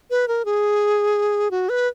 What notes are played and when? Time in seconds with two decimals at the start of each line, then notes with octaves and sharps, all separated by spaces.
0.11 B4
0.28 A#4
0.45 G#4
1.51 F#4
1.69 B4